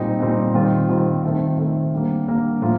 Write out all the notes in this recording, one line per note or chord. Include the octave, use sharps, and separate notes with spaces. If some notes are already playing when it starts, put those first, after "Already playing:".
Already playing: A#2 G3 C4 D#4
A#2 G3 C4 D#4
D#3 G3 C4 F4
D#3 G3 C4 F4
D#3 A3 C4
D#3 A3 C4
D3 G3 A#3
D3 G3 A#3
A2 F3 A#3 F4